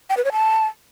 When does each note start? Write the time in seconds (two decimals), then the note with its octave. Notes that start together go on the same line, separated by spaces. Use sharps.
0.10 G5
0.17 B4
0.25 C#5
0.32 A5